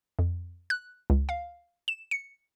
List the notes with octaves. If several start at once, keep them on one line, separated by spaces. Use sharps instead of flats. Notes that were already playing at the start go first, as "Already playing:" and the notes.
F2
F#6
C#2
F5
E7
C#7